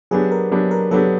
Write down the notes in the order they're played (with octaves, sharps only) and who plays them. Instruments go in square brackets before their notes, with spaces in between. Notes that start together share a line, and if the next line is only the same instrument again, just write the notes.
[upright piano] F#3 B3 D4 G4 [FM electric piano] G#4
[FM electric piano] A#4
[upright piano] F#3 B3 D4 G4
[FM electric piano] A#4
[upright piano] F#3 B3 D4 G4 [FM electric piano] A4